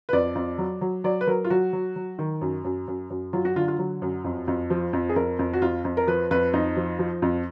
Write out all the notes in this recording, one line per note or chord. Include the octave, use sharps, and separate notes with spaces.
B4
F2 D5
F2
F#3
F#3
F#3 D5
B4
F#3 A#4
F4
F#3 F#4
F#3
F#3
D#3
F#2
F#2
F#2
F#2
F#3 F4
F#4
D3 F4
F4
F#3
F#2
F2
F2
F3
F2
G#4
F2 A#4
F2
F#4
F2 F4
F2
A#4
F3 B4
F2 B4
F2 D#4
F3
F3
F2